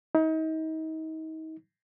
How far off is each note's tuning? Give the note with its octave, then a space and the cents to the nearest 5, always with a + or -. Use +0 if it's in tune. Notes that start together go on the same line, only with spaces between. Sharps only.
D#4 +35